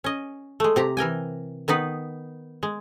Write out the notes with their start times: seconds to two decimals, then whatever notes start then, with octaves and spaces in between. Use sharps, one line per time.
0.04 C#4 D#5
0.60 G#3 A3
0.76 C3 G4 A#5
0.97 E3 A#4 G5 G#5
1.68 D#3 B3 D#4 B4
2.63 G#3